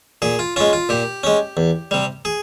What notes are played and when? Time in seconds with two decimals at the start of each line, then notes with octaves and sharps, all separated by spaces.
0.22 A#2 G#4
0.39 F4
0.56 G#3 C#4 F4
0.73 F4
0.89 A#2 G4
1.23 G#3 C#4
1.57 E2
1.91 C3 G3
2.25 G#4